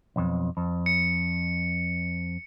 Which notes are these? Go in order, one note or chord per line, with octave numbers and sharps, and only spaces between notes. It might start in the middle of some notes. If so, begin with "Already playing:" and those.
B1 F2
F2
C#7